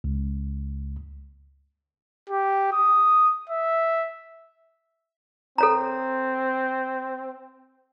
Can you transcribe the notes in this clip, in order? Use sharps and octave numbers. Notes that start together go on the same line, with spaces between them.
C#2
G4
D#6
E5
C4 A4 C#5 A#5